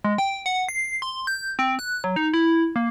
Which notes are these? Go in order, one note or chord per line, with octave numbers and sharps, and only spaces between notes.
G#3
G5
F#5
C7
C6
G6
C4
F#6
F#3
D#4
E4
A#3